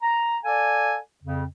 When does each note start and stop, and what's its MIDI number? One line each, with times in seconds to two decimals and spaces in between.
0.02 0.37 82
0.44 0.96 69
0.44 0.96 74
0.44 0.96 77
0.44 0.96 80
1.23 1.44 41
1.23 1.44 49